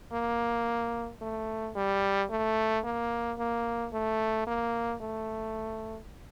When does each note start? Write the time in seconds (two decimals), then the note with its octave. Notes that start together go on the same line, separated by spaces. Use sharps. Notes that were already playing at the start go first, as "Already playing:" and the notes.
0.12 A#3
1.21 A3
1.76 G3
2.30 A3
2.84 A#3
3.39 A#3
3.93 A3
4.47 A#3
5.01 A3